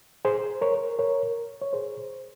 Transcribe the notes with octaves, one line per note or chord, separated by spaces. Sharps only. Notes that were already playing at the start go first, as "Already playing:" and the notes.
G#4 C5
A#4 C#5
A#4 C#5
C#5
G#4 C5